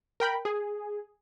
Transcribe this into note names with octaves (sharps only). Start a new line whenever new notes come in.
A#4 G5 B5
G#4